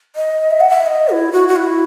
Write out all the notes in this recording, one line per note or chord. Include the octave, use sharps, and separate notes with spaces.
D#5
E5
F#5
E5
D#5
E4
F#4
F#4
E4